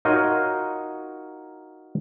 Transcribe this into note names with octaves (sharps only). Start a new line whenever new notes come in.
D#4 F4 F#4 A#4 C#5 D#5